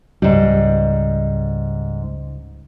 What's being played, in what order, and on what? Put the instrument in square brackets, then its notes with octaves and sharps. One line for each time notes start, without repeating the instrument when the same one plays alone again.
[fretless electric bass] C#2 [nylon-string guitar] G#2 G3